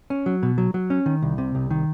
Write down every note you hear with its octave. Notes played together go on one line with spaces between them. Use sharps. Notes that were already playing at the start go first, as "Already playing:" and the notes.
C#4
F#3
B2
F#3
F#3
C#4
D#3
C2
C3
C2
D#3